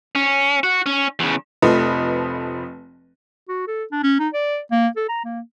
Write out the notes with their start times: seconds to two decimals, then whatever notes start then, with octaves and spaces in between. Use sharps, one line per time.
0.15 C#4
0.64 F#4
0.86 C#4
1.19 E2 C#3
1.62 F1 F3 A3 B4 D#5
3.49 F#4
3.68 A4
3.92 D4
4.03 C#4
4.20 D#4
4.34 D5
4.71 A#3
4.96 A4
5.09 A#5
5.25 A#3